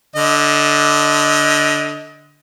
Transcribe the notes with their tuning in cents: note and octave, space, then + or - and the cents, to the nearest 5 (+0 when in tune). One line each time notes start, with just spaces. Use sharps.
D3 +0 D#5 +25